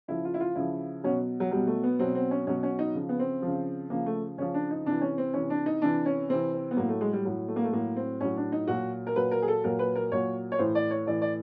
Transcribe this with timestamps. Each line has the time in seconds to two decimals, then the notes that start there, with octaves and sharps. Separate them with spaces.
0.08 C#3 F3 E4
0.25 F4
0.34 E4
0.40 F4
0.55 C#3 F3 E4
1.04 B2 F#3 C#4
1.40 F#3
1.51 B2 F#3 G3
1.67 A3
1.83 B3
1.99 B2 F#3 C4
2.15 C4
2.31 C#4
2.47 B2 F#3 C#4
2.63 C#4
2.79 D#4
2.94 C#3 F3
3.09 B3
3.19 C4
3.42 C#3 F3
3.90 C#3 F3 A#3
4.06 A3
4.38 C#3 F3 C#4
4.54 D4
4.71 D#4
4.86 C3 E3 D4
5.01 C#4
5.18 C4
5.34 C3 E3 C#4
5.50 D4
5.66 D#4
5.82 C3 E3 D4
6.06 C#4
6.29 C3 E3 C4
6.53 C4
6.71 B3
6.77 A2 F#3 A#3
6.89 A3
7.01 G#3
7.13 G3
7.25 A2 F#3
7.48 A3
7.56 A#3
7.64 A3
7.72 A2 F#3 A#3
7.96 C4
8.21 A2 F#3 C#4
8.37 D4
8.52 D#4
8.67 A#2 F#3 F#4
9.07 A#4
9.16 A#2 F#3 B4
9.31 A#4
9.42 G#4
9.48 A4
9.64 A#2 F#3 A#4
9.79 B4
9.96 A#4
10.12 A#2 F#3 C#5
10.52 C#5
10.59 A2 E3 C5
10.75 D5
10.91 C#5
11.06 A2 E3 D5
11.22 D5